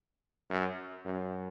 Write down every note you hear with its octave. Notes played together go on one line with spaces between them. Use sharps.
F#2
F#2